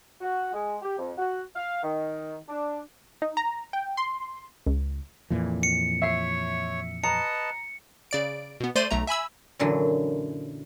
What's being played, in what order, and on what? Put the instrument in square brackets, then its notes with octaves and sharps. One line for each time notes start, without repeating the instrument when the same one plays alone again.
[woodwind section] F#4
G#3
G4
F2
F#4
F5
D#3
D4
[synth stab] D#4
A#5
G5
C6
C#2
[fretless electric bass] F2 A#2 E3
[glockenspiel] C#7
[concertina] C#5 [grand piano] E5 C7
[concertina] B4 D#5 A5 [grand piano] A#5 [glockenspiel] C#7
[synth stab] C#3 D5 D7
B2 B3
A3 C5 D5 C6 D#7
B1 A3 A#5
E5 G#5 B5 E6
[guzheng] F#2 A#2 D3 E3 F#3